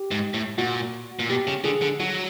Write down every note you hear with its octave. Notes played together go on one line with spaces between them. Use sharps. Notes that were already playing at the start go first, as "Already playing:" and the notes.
Already playing: G4
G#2
A2
A#2 F#4
A#2
B2 G4
C#3
D3 G#4
D3
F#3 F#4